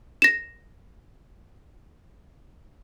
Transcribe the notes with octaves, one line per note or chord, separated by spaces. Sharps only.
A#6 E7